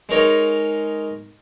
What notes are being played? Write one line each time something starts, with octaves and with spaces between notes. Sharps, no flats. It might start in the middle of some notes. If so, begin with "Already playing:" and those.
G#3 D#4 A#4 C#5